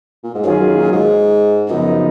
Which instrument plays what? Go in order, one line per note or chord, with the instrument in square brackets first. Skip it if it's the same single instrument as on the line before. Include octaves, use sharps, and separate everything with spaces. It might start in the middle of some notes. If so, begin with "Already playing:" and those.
[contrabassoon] A#2
G#2
[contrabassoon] F#2 [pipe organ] D#3 F#3 C#4 F4 G#4
[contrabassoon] F#2
A#2
G#2
[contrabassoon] F#2 [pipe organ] C#3 F3 B3 D#4